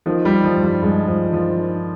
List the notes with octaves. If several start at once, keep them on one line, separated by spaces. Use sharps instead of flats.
D#3 F3
G3
D#3
F3
G2
G3
G2 G#3
G2 F3
D#3 F3
D#3